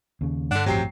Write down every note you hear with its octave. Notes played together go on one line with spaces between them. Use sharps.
D#2 C#3
G2 D3 D4 F#5
A1 F2 C3 F#3 G5 C7